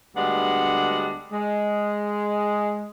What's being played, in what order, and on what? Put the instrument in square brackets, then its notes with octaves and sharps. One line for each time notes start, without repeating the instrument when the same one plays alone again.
[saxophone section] D2 G3 G#3 B3 D4 F#5
G#3